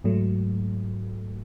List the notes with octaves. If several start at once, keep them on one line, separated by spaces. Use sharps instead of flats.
G#2 F#3 A3